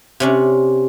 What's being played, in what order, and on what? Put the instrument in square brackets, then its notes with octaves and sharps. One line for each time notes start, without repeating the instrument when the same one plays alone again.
[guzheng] C3 C#4 D4